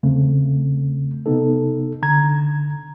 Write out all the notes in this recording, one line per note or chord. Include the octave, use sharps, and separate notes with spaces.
E2 C#3 A3 C4
C3 B3 D#4 A4
D3 A#5 G#6